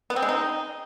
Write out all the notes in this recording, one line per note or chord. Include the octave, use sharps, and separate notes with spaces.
B3
C4
G#3
D#4